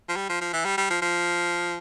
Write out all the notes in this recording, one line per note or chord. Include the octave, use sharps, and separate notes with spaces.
F3
G3
F3
F3
E3
G3
G3
F3
F3